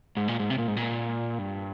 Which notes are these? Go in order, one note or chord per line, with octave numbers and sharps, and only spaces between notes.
G#2
A#2
G#2
C3
A#2
G#2
A#2
G2